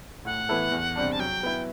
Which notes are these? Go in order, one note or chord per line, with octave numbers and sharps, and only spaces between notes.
A2 F#5
E3 B3 E4 A4
E2
C3 G3 D4
A5
F#3 G5
B3 E4